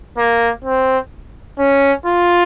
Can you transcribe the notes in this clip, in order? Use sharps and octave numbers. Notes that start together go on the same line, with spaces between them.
A#3
C4
C#4
F4